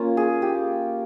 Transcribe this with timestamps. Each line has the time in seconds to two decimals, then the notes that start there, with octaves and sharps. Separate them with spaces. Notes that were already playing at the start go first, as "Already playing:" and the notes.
Already playing: A#3 C#4 F4
0.17 G#4
0.42 G4